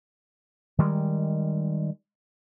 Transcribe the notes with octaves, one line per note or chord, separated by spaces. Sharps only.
D#3 G3 G#3